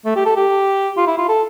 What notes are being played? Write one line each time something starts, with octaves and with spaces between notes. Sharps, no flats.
A3
G4
A4
G4
F4
E4
F4
A4